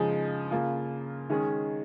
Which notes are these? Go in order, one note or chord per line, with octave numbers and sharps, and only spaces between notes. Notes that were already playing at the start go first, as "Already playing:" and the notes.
Already playing: C#3 F3 G#3 D#4 G#4
C#3 A#3 F4
D#3 G#3 C#4 G#4